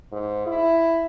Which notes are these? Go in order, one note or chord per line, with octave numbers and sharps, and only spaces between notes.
G#2
E4